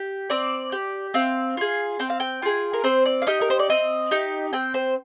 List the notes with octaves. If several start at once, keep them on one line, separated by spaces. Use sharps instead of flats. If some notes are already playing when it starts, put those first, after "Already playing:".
Already playing: G4
C4 D5
G4
C4 F5
F4 G#4
C4 G5
F5
G5
F4 G#4
A#4
C4 C5
D5
F5
D#4 G4 D#5
A#4
C5
D5
C4 D#5
D#4 G4
C4 G5
C5